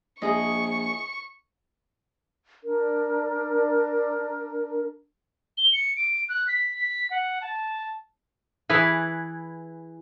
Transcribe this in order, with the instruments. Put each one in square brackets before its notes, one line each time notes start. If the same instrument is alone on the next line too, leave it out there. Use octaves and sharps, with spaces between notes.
[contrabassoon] A#1 [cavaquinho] E4 G#4 D#5 [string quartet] C#6
[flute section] D4 A#4
[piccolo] G7
C#7
D7
F#6
B6
B6
F#5
A5
[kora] E3 E4 G#4 B4